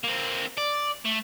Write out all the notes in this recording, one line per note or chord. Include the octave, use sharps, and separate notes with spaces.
A#3 C4
D5
A3